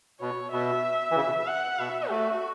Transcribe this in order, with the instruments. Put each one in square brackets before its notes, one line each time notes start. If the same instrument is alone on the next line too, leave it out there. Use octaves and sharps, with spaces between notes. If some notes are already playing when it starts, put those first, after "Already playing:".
[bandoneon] B2 [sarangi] C#5
[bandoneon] B2 [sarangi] E5
[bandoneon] E3
C#3
B2
[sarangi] F#5
[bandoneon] B2 [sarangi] E5
[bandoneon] A3 [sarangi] F#4